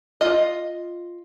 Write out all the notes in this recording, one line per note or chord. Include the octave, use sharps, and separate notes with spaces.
F4 D#5